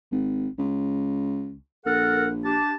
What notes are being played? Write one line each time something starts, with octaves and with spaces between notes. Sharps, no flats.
G#1
C#2
A#1 A4 A#4 F#5
D4 G4 A5